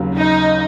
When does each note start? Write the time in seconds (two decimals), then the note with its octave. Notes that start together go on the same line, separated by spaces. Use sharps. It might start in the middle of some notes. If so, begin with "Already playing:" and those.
Already playing: D#2 C#3 F#3
0.16 D#4